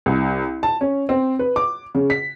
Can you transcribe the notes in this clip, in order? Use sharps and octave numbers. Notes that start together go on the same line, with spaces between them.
C2
A5
C#4
C4
B4
D6
C#3
B6